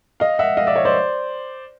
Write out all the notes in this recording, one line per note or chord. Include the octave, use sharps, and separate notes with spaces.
D#5 F5
E5 F#5
D#5 F5
D5 E5
C#5 D#5
C5 D5